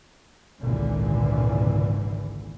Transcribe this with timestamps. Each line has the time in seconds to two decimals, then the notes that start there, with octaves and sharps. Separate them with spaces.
0.61 G#1 C#2 A#2 D3 E3